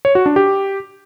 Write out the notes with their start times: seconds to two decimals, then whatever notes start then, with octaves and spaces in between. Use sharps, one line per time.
0.05 C#5
0.15 F#4
0.26 D4
0.36 G4